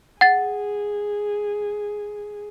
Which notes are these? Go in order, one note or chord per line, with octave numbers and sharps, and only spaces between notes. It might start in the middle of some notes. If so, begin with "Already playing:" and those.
G#4 F#5 A6